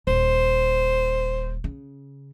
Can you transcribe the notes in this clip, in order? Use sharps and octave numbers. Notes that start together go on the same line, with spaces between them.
D#1 C5
C#3